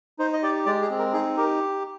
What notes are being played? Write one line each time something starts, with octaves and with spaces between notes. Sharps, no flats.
D#4 C5
D#5
G4 D5
G#3 D5
G#4
C4
A#4
D#4 G#4
G4 A#4